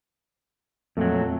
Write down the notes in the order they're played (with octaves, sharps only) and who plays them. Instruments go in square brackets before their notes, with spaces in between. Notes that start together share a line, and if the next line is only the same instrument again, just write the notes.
[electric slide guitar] F2 A#2 F#3 [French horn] A3